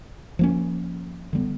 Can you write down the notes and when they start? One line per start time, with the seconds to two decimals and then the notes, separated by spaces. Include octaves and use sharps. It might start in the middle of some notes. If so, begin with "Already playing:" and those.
0.39 F3 A#3 C#4
1.33 D3 G3 B3